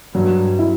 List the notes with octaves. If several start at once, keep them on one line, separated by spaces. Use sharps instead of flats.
G2 F#3
E4